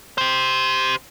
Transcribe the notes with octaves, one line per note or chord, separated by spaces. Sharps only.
G4 C5